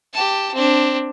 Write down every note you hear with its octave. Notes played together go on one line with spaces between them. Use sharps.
G4 A5
C4 D4